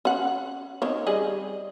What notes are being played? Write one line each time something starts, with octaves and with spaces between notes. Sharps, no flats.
C#4 F#5
D#3 C4 C#5
G3 G#4 D#5